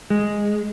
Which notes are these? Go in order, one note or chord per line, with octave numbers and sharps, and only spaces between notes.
G#3